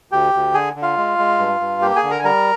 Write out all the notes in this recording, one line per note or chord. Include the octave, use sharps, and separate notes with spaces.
D2 G4 G5
D2
D3 G#4 G#5
D3
F4 F5
G#3
G#3
G2
G2
A#3 G4 G5
G#4 G#5
D3
A#4 A#5
G#5
G3 A#4 A#5